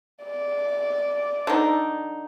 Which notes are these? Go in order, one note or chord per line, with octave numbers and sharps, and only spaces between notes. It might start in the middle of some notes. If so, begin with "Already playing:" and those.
D5
D3 D#4